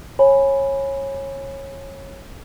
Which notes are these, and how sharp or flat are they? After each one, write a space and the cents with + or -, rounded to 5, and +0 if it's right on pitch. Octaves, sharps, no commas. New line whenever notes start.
C#5 -20 G#5 +0 B5 +0